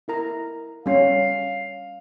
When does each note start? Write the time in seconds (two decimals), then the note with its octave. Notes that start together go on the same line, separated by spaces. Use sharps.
0.08 E4 A#4 A#5
0.86 G3 C#4 F5